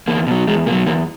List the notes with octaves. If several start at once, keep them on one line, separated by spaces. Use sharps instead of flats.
E2 A#3
B2 F#3
E2 G#3
B2 F#3 A#3
E2 A#3